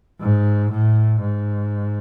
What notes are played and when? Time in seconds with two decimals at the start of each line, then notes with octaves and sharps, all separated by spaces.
0.20 G#2
0.71 A2
1.21 G#2